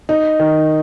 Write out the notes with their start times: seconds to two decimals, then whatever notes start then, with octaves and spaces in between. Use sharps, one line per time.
0.09 D#4
0.40 D#3